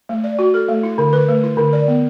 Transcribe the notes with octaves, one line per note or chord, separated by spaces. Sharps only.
A3
D5
F#4
A4
A3
E4
D3
B4
A3
E4
D3
D5
B3